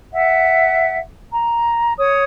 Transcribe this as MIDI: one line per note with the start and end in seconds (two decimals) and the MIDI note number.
0.12 0.96 76
0.12 0.96 78
1.32 1.94 82
1.97 2.24 73
1.97 2.24 87